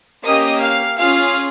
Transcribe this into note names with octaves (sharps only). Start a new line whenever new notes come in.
A#3 C#4 G4 D#5 D#6
F5 F6
C#4 F4 G#4 F5 F6